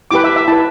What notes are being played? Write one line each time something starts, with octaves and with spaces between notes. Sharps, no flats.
E4 G4 B4 D6
E5
E5
E4 B4 A5